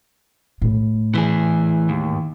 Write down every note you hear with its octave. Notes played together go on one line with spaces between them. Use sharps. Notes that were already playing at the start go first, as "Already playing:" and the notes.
A2
E3 G#4
D#2